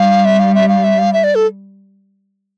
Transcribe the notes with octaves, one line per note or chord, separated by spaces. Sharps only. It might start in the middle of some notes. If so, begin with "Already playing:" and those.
Already playing: G3 F5
E5
F5
E5
F5
E5
F5
E5
D5
A4